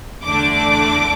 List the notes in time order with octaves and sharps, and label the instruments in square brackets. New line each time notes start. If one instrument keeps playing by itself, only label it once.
[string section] E2 D3 A3 D4 D6